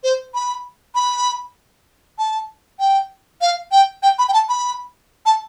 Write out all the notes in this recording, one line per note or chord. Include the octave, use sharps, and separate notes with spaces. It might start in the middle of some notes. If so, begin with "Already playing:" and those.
C5
B5
B5
A5
G5
F5
G5
G5
B5
G5
A5
B5
A5